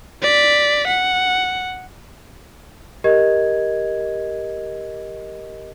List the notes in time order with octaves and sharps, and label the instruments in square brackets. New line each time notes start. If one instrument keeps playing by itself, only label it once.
[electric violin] D5 B6
F#5
[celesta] G4 A#4 D#5 G#6